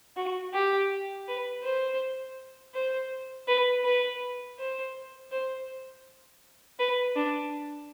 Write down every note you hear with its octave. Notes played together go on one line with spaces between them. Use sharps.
F#4
G4
B4
C5
C5
B4
B4
C5
C5
B4
D4